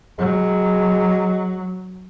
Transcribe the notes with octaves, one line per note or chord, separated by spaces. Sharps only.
F#3 G#3